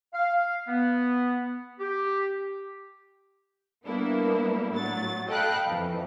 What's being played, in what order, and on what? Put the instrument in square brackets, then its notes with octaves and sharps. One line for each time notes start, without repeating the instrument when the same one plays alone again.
[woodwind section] F5
B3
G4
[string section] G3 A#3 B3 D4 E4
A2 F#3 A6
A4 D#5 F5 G5 B5 F#6
F2 E3